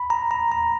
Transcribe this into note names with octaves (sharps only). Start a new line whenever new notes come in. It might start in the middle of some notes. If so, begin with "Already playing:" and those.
Already playing: B5
A#5
A#5
A#5